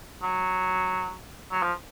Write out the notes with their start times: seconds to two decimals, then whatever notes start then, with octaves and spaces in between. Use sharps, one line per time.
0.23 F#3
1.52 F#3
1.63 F3